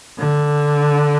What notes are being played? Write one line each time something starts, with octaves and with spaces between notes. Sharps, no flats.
D3